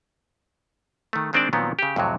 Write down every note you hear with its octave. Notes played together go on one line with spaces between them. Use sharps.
D#3 A3
D#3 G#3 C4 D4 C5 D5
A#2 D#3 F3 F#3 B3 C4
C#3 G4
F2 A2 C3 F#3